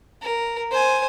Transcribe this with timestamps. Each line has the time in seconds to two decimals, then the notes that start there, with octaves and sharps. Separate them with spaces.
0.22 A#4
0.71 C5 G#5